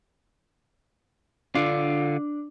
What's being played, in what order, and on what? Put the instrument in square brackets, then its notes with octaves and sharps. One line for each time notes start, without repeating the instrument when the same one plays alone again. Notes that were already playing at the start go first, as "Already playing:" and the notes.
[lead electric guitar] D3 F4 [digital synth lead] D4